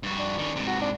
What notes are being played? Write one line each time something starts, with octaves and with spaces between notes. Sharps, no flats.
G2 F#4
D4
D#3 C#4
G#2 C3
F#4
D4